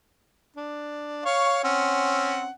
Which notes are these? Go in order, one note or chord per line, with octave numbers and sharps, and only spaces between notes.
D4
C#5 F5 C#6
C4 C#4 F#5